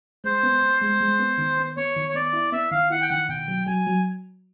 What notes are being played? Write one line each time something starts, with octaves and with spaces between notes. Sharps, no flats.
G#3 C5
B3
B3
G#3
G#3
B3
D#3
B3
B3 C#5
D#3
C#5
B3 D5
E4
B3 E5
D#3 F5
E4 F#5
G5
D#3 F#5
B2 G5
F#3
F#3 G#5
F#3